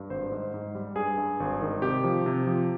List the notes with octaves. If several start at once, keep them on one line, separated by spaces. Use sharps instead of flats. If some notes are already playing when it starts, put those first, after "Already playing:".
Already playing: G2
G#1 C5
G#2
G#2
G3
G2 G#4
G2
G#1
D#3
C3 G4
F3
C3
F3